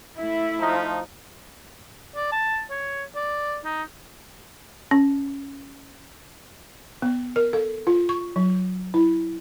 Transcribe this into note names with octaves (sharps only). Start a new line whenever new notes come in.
A3 E4 E5
F3 D#4
D5
A5
C#5
D5
D#4
C#4
B3
A#4
A4
F4
C#6
F#3
E4